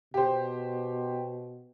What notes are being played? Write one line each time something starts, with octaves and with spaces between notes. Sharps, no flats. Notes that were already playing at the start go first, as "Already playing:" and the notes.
B2 G4 C5